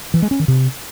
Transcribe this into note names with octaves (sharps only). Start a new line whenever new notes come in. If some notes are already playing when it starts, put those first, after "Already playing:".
E3
G#3
C#4
D#3
C3